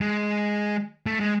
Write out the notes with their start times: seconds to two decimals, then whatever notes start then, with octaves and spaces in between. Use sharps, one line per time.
0.01 G#3
1.06 A3
1.20 G#3